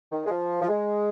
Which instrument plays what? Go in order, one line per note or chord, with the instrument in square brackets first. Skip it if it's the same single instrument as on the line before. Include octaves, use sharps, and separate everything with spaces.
[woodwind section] D#3
G#3
F3
F3
G#3